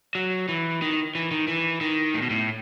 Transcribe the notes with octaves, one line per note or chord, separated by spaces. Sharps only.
F#3
E3
D#3
E3
D#3
E3
D#3
A2
B2
A2